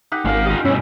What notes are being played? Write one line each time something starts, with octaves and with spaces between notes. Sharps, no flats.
D#4 G4 F#5
G#1 G#3 C#4 A#4 F5
F4 G4 D#5
G2 B2 C#4 E4